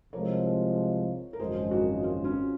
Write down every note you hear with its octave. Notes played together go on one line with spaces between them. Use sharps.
C2 C3 F3 G#3 A#4 C#5
A#4
G#1 F#2 C#3 F3 G#3 G#4 C5
F#4 A#4
F4 G#4
C#4 F4